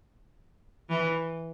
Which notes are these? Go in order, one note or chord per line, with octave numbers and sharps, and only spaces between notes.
E3